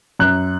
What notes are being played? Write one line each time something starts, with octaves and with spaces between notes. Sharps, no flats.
F#2 F#6